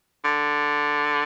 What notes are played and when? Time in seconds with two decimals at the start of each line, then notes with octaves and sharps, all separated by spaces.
0.25 D3